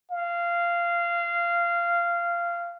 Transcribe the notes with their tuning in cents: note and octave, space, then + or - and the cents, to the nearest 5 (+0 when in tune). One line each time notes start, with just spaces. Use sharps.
F5 -15